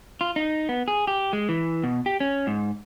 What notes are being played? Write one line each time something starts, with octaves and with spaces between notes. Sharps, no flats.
F4
D#4
B3
G#4
G4
G#3
E3
B2
G4
C#4
G#2